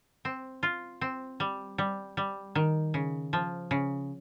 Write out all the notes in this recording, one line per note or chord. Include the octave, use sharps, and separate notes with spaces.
C4
F4
C4
G3
G3
G3
D#3
C#3
F3
C#3